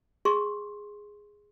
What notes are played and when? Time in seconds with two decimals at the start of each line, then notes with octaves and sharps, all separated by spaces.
0.25 G#4 C6 C#6